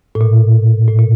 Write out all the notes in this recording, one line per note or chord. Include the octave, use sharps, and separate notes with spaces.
A2
A#2
A2
A#2